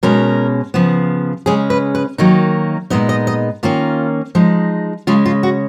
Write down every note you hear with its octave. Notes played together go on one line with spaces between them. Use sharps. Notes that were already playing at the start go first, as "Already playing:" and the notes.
B2 G#3 C#4 A#4
C#3 F3 B3
C#3 G#3 C#4 G#4
B4
B4
D#3 F#3 A#3 D#4
A#2 G#3 B3 D#4 D#5
D#5
D#5
D#3 A#3 C#4 F4
F3 G#3 D#4
C#3 G#3 C#4 F4
F4
F#4